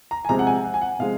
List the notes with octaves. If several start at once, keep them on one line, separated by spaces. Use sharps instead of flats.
A#5
G#5
C3 F3 G#3 A#5
F#5
G#5
F#5
G#5
F#5
C3 F3 G#3 F5